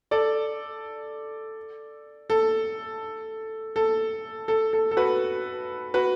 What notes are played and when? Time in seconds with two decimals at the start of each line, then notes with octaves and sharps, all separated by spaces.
0.11 A4 D5
2.30 A4
3.76 A4
4.48 A4
4.73 A4
4.91 A4
4.97 F#4 B4
5.94 F#4 B4